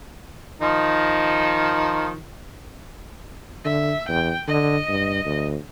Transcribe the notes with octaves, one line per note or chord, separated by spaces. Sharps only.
D#3 F3 D#4
D3 E5
E2 G5
D3 D#5
G2
D2